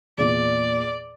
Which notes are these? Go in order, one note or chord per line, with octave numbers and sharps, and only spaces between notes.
E2 A#2 D5